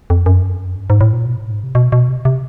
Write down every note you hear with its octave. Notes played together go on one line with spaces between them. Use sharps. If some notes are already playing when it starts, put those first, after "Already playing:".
F2
F#2
G2
G#2
A2
A#2
B2
A2
G#2
C3
B2
B2
C3
C3